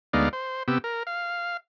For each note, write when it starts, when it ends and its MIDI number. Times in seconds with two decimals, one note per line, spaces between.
0.13 0.29 38
0.13 0.29 56
0.13 0.29 59
0.13 0.29 63
0.13 0.29 74
0.13 0.29 77
0.33 0.63 72
0.68 0.78 48
0.68 0.78 59
0.68 0.78 67
0.68 0.78 88
0.84 1.03 70
1.07 1.57 77